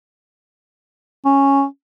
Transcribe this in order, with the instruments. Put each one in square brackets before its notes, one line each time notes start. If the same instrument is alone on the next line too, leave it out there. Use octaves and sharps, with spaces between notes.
[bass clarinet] C#4